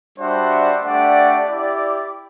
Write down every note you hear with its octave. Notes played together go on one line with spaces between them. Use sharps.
G3 D4 F#4 C5 E5
A3 D4 G4 D5 F#5
E4 G4 D5